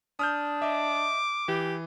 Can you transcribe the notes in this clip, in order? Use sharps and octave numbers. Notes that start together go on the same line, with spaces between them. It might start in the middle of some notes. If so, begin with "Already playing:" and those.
D4 D#6 F6 G6
D#5 E5 D6
E3 G4